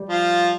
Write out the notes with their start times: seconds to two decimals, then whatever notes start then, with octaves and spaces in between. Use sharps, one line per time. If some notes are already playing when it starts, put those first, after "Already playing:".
Already playing: G3
0.09 F3 F4